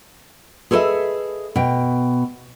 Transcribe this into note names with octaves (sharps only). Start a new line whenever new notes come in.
G#4 A4 B4 C5 D#5 E5
B2 G5